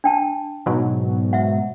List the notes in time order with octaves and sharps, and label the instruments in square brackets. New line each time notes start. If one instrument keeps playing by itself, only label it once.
[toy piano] D4 G5 A5
[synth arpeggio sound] G#2 B2 F#3
[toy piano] E5 F#5